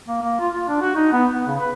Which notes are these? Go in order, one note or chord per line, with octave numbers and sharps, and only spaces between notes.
A#3
A#3
F4
F4
D4
F#4
D#4
B3
B3
C#3
B4